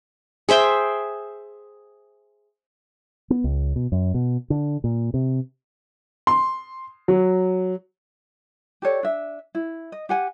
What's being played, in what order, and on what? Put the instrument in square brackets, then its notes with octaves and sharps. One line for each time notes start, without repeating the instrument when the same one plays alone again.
[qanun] G#4 C5 E5 G5
[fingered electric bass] B3
C#2
B2
F#2
B2
D3
A#2
C3
[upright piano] C6
F#3
[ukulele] G4 A4 C#5 D5
D4 E5
E4
D#5
G4 F#5 G#5